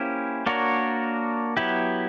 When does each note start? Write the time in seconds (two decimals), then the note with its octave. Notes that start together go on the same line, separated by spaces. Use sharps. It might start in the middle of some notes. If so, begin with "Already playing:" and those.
Already playing: A#3 C#4 E4 G4 C5
0.46 A#3 D4 F#4 A#4 C#5
1.57 F#3 B3 E4 G4